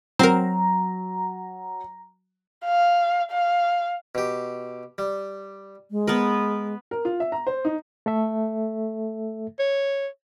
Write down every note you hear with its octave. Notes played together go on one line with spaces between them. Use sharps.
F#3 C4 A#4 A#5
F5
F5
B2 G4
G3
G#3
B3 A#4 B4
A#4
F4
E5
A#5
C5
D#4
A3 A4 E5
C#5